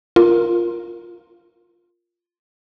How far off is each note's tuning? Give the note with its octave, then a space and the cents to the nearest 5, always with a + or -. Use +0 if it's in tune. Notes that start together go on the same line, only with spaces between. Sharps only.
F4 +0 A#4 +0